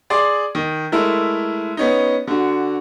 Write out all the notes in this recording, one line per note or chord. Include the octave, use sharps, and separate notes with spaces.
G#4 D5 C6 D6
D#3
G#3 A3 E4 A#4
B3 C#4 D#4
D3 F#4